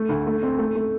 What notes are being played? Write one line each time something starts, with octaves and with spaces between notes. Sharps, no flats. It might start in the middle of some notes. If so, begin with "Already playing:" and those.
Already playing: A3
D2
A3
C4
A3
A3